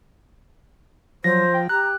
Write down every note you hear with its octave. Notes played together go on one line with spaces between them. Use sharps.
F3 F#3 C5 A#6
G5
G4 A#5 F#6